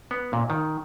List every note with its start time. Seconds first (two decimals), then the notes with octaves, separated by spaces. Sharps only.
0.11 B3
0.33 A#2
0.50 D#3